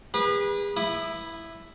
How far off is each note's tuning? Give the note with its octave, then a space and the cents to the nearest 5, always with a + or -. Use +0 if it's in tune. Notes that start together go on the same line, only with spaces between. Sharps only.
G#4 -40 B4 -20
E4 +0 D#6 -20